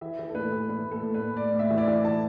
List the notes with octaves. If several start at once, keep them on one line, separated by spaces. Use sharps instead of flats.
E3 E5
E3
A4
A2 B4
E3
A2 B4
A2
A4
A2
B4
A2
A2 D5
A2
E5
E3
D5
E5
E3
E3 A5